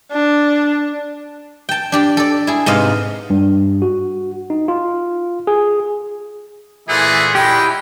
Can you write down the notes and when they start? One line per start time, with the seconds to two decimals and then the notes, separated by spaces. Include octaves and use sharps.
0.12 D4
1.69 G5 A5
1.92 D4 G4 D5
2.17 A4 D5
2.47 E4 G#4
2.66 G#2 C3 B3 D#5 F5
3.30 G2
3.82 F#4
4.50 D#4
4.68 F4
5.47 G#4
6.89 A#2 E3 A3 E4 G#4 F#5 G6
7.35 G#3 E4 G4 G5